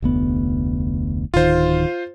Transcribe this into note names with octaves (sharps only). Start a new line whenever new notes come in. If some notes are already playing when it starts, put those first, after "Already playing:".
F1 D2 B3
D1 D#3 F4 C5